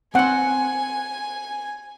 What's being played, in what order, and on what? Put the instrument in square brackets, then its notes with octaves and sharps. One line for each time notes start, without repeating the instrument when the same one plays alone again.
[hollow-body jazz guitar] C4 C5 [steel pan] F#5 [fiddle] G#5